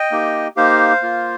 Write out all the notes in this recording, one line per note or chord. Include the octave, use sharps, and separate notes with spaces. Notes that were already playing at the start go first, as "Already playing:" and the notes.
Already playing: D#5 G5
A#3 D#4 G4
A#3 D#4 G4 C5 F5
A#3 F4